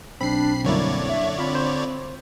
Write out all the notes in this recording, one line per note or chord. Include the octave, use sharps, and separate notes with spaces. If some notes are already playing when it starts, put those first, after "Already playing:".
B1 C4 D4 B5 C7
F#2 D3 G3 A#3 E4 C#5 D5
E5
C4 F4 B5
C5